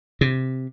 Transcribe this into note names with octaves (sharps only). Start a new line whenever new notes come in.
C3